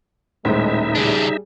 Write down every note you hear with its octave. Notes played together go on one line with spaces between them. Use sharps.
D#1 A2 G#3 D#4 C5 E5
C#3 G3 D4 G#4